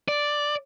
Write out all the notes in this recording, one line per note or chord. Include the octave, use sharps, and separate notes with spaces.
D5